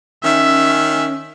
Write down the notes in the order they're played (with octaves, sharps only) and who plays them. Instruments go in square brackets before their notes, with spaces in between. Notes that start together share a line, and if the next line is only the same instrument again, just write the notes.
[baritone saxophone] D#3 [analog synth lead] C#4 [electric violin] E5